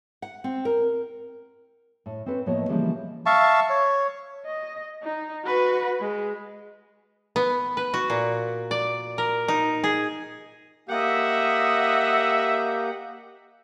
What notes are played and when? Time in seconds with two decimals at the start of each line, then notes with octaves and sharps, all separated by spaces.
0.22 F#5
0.44 C4
0.65 A#4
2.06 A2
2.26 C4 C#4 A4 B4
2.46 A2 F3 A#3 B3 C#5 D#5
2.69 C#3 E3 F3 G3 A#3 C#4
3.26 E5 F5 A5 C#6
3.70 C#5
4.46 D#5
5.03 D#4
5.45 F#4 B4
6.01 G#3
7.36 B3
7.77 B4
7.94 F#4
8.10 A#2
8.71 D5
9.18 A#4
9.48 D#4
9.84 G#4
10.89 A#3 G4 D#5 E5 F#5 G6